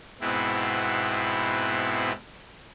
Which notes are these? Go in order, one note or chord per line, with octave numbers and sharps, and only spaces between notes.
G#2 B2 B3 C4 E4